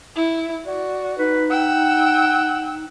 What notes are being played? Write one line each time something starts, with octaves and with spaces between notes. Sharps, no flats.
E4
F#4 D5
D#4 B4
F#5 G5 E6